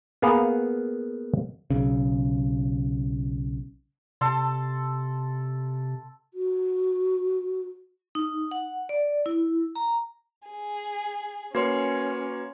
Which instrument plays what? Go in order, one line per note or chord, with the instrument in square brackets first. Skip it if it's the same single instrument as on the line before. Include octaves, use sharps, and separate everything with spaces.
[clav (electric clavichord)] A#3 B3 G#4 F5 F#5
[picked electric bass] B1 C#3
[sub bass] C3 [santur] A4 A5 C6
[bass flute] F#4
[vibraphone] D#4
F#5
D5
E4
A#5
[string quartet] G#4
[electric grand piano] A#3 C#5 [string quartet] C#4 [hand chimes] F#4 B4 C6